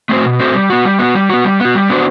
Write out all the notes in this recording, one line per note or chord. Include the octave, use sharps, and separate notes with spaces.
A3 C4 F#4 C5
B2
A3 C4 F#4 C5
G3
B3 F#4
G3
B3 F#4
G3
B3 F#4
G3
B3 F#4
G3
B3 D4 F#4 C5